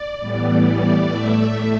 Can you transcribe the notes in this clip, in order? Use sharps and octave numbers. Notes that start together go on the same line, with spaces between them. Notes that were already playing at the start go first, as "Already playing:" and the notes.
Already playing: D5
A2 E3 G3 B3
A2 A3 E5